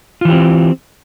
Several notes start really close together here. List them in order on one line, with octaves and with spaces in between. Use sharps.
F4 E3 G4 C4